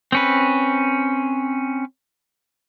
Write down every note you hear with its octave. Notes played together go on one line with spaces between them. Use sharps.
C4 C#4 B4